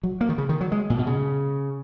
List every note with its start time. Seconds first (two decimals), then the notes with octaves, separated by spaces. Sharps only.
0.03 F#3
0.21 A#3
0.29 D#3
0.38 C#3
0.49 D#3
0.61 F#3
0.72 G#3
0.90 A#2
0.99 B2
1.07 C#3